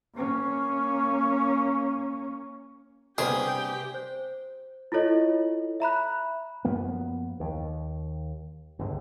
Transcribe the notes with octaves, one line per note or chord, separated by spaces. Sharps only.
A#3 C#4
G2 C3 A#3 B3 G4 G#4 C5 G5
C5
E4 F4 A4 C#5 D#5
E5 A#5 B5 F#6
F#2 F3 A#3 B3
D#2
G1 C#2